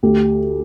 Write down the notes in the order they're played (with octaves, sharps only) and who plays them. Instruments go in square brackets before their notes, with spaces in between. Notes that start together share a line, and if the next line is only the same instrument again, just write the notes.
[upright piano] D2 G4